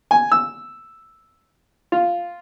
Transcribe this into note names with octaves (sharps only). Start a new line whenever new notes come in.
G#5
E6
F4